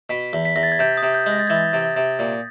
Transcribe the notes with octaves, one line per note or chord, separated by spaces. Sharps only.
B2 B6
E2
B6
E2 A#6
A6
G#6
C3 G6
D#6
C3
G6
G#3
A#6
A6
E3 G#6
A6
C3
C3
A#2